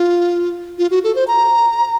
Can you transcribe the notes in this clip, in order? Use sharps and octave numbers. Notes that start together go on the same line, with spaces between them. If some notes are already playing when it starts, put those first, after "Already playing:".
Already playing: F4
F4
F#4
A4
C5
A#5